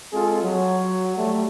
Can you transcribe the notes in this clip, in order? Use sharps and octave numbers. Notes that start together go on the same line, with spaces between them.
G#3 C4 F4 G#4 A4
F#3
G3 A3